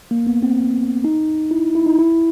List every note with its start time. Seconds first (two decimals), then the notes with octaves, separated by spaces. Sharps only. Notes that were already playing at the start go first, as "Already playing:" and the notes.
0.11 A#3
0.27 B3
0.43 C4
1.04 D#4
1.51 E4
1.75 E4
1.86 D#4
1.99 E4